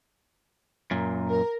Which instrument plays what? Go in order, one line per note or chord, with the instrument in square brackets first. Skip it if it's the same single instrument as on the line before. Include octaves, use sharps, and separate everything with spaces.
[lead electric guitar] F#2 A#2
[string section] A#4